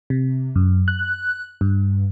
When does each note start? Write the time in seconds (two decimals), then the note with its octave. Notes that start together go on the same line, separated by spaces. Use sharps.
0.10 C3
0.56 F#2
0.88 F#6
1.61 G2